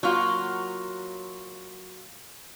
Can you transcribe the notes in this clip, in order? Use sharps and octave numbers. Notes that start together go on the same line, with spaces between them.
F#3 A#3 F4